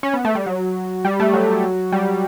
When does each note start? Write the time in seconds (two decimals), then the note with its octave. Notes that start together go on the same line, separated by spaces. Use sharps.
0.03 C#4
0.14 B3
0.25 A3
0.35 G3
0.46 F#3
1.05 G3
1.20 A3
1.33 F#3
1.92 G3